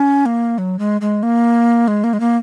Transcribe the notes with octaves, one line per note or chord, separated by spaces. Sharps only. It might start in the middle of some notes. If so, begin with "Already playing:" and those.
Already playing: C#4
A#3
F#3
G#3
G#3
A#3
G#3
A#3
G#3
A#3